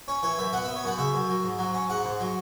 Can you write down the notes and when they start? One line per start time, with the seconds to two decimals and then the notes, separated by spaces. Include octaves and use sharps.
0.08 C#4 C#5
0.23 E3 C#5
0.38 F#2 E5
0.53 B3 F#5
0.64 B3 E5
0.76 C#5
0.84 F#2 F#5
0.98 C#3 E5
1.14 F#2
1.29 F#3
1.44 G#2
1.59 F#3
1.74 C#4
1.89 G#2 F#5
2.05 G#2
2.20 F#3